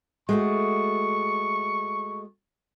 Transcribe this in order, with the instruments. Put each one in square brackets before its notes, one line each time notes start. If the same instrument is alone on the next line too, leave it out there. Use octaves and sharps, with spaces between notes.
[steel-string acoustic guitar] G#3 A3 F#4 [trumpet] C#6